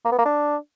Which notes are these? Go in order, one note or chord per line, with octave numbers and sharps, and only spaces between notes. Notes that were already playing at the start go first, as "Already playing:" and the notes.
A#3
B3
A#3
D4